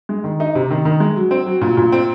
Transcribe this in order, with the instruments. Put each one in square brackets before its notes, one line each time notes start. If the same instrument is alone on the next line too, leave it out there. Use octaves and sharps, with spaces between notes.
[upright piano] G#3
D#3
D#4
C3
D#3
D#3
G#3
F#3
C4
F#3
A#2
A#2
C4